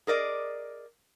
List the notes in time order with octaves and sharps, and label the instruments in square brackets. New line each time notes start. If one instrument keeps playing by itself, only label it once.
[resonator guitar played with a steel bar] G#4 A#4 D5 D#5